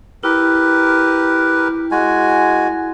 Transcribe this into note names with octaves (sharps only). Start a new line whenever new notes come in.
E4 G4 A#4 B4
G#3 F#4 G#5